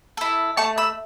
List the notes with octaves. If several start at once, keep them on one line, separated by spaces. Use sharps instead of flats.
E4 A4
A3 A5 C#6
B5 E6